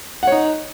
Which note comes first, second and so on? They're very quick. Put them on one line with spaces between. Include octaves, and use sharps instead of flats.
F#5 C#5 D#4